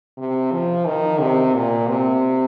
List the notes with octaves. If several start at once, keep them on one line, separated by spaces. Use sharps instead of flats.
C3
F3
D#3
C3
A#2
C3